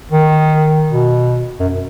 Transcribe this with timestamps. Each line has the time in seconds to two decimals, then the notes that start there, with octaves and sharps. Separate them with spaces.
0.12 D#3
0.89 B2
1.59 F#2